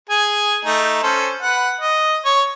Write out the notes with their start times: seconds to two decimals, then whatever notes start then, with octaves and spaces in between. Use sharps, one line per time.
0.10 G#4 G#5
0.65 A3 D#4
1.03 C#4 A4 C5
1.42 B4 F#5
1.81 D#5
2.25 C#5